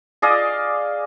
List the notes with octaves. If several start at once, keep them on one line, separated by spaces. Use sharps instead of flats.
G#4 D5 D#5 F5